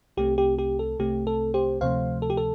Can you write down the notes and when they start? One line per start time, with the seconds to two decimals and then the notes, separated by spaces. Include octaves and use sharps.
0.17 C2 C3 A3 C4 G4
0.38 G4
0.59 G4
0.79 A4
0.99 C2 C3 A3 C4 G4
1.27 A4
1.54 G4 C5
1.81 D2 C3 F3 A3 C5 F5
2.22 A4
2.30 G4
2.37 A4